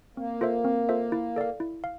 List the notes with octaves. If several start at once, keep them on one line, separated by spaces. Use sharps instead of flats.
A#3 C4
F4 A4 C5 E5
C4
F4 A4 C5 E5
E4
A4 D5 F5
E4
F5